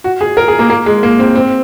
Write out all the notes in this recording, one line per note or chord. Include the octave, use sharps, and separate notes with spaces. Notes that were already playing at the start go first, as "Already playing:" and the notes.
F#4
G#4
A#4
G#4
A#3
A#3
G#3
A#3
C4
C4